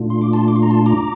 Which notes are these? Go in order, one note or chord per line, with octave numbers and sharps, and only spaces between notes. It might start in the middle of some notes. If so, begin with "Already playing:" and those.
Already playing: A#2 A3 D4 F4
C6
D6
A5 C6
D6
C6
A#5
A5 C6
A#5 D6